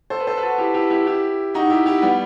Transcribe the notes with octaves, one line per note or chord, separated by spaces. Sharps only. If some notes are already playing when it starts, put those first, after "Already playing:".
A4 C5
B4
A4 C5
B4
F#4 A4
E4 G4
E4 G4
E4 G4
E4 G4
D#4 F#4
E4 G4
E4 G4
G3 B3